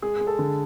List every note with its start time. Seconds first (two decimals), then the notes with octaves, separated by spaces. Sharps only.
0.02 G#3 G#4
0.16 G#3 G#4
0.27 A4
0.39 D3